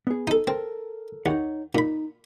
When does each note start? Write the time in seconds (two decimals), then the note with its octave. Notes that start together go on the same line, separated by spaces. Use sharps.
0.07 B3 G#4
0.27 D#4 A4
0.47 C4 A4 A#4
1.26 D#2 D#4 C#5 F#5
1.75 A#2 D#4 B5